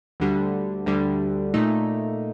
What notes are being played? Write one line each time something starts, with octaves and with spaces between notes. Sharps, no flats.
D2 D3 G3
D2 D3 G3
A#2 A3 D#4